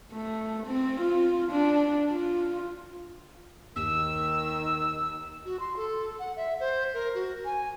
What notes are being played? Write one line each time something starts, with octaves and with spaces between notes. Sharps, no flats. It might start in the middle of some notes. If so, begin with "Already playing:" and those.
A3
C4
F4
D4
F4
D#2 D#3 E6
F#4
C6
A4
F#5
E5
C5
A#4
F#4
G#5